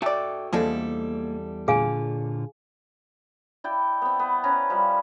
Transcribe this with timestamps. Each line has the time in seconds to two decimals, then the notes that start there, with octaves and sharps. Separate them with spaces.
0.02 A3 F#4 A4 D5 G5
0.53 E2 F3 G3 G#3 A#3 D4 A4
1.68 A#2 D3 F4 G#4 F5 G#5
3.64 E4 D5 G5
4.02 B3 C4
4.20 B3
4.44 C#4 B4 A#5
4.70 F3 G3 B4